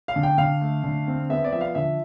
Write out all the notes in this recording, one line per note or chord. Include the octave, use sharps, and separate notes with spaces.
F5
D3
G5
D3 F5
A3
D3
C4
B3 E5
D5
F3 E5
F5
D3 E5